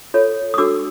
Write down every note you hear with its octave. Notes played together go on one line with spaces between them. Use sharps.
F4 A4 C#5
D#6
D4 F#4 A4 D6 E6